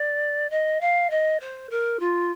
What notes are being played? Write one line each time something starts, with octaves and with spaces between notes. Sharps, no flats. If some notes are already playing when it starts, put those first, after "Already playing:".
Already playing: D5
D#5
F5
D#5
C5
A#4
F4